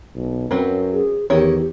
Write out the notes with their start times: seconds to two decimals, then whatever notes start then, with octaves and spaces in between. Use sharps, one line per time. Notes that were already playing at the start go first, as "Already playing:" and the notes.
0.15 B1
0.51 F#2 F#3 C4 B4
0.93 G#4
1.30 E2 D#3 E4 G4 C#5